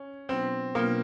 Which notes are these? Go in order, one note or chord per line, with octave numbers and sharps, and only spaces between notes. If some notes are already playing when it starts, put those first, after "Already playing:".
Already playing: C#4
B2 F#3 B3 C4 D4 F4
B2 F#3 A#3 B3 D4 F4